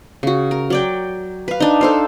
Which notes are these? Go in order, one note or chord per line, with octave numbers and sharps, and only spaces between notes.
C#3 F#4
A#4
F#3 D5 G5
B4 F5
D4 D#4
A4 C5 F5